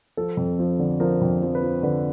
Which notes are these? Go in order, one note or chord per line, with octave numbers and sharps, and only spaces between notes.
F3 A4
F2
F3
D3
F3 A#4
F2
F3
B4
F3
D3 B4